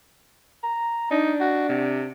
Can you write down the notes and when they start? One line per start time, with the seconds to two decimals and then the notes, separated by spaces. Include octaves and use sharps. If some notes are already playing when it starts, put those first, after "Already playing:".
0.64 A#5
1.11 D4 D#4
1.41 F#4
1.69 C3